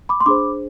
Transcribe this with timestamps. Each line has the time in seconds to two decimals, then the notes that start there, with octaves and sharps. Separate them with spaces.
0.09 B5 D6
0.20 C6
0.26 D4 G#4 C5 B5 D6